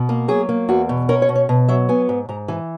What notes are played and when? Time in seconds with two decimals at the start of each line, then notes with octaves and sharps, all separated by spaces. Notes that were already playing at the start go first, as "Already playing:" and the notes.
Already playing: B2
0.09 A#3
0.28 F#3 G#4
0.49 A#3
0.69 E2 F#4
0.89 B2
1.09 C#4 A#4
1.22 C#5
1.29 B2
1.36 C#5
1.49 B2
1.68 F#3 E5
1.89 B3 G#5
2.09 G#2
2.29 G#2 A#5
2.48 E3 G#5